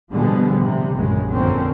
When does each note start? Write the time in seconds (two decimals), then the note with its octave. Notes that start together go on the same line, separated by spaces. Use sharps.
0.12 B2 D3 F3 G3 G#3 B3
0.62 C3
0.96 A#1 F#2 C#3 G#3
1.32 F2 D3 A#3 C4 C#4